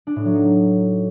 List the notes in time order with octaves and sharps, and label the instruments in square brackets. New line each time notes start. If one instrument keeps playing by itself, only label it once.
[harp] D4
A2
F#3
D#4